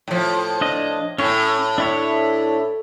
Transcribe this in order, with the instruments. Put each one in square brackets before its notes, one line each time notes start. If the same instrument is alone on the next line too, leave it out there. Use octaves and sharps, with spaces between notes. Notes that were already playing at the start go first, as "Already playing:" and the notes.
[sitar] A2 F3
[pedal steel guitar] D4 D#5
[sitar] A2 [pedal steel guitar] C#4 C#5
[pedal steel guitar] D4 E4 C#5